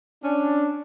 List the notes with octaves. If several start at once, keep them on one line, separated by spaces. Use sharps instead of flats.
C#4 D4